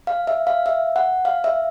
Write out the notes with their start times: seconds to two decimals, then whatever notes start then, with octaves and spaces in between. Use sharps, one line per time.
0.07 F5
0.27 E5
0.47 F5
0.66 E5
0.96 F#5
1.25 F5
1.44 E5